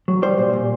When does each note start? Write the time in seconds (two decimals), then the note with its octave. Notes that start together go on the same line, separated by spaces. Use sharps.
0.08 F#3
0.22 G3 C5
0.38 A#2
0.53 A#2